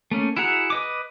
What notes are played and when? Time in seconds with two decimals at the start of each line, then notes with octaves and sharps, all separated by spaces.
0.11 A3 A#3 C#4
0.37 E4 F#4 G#4 F#5 A#5
0.70 B4 D#5 D6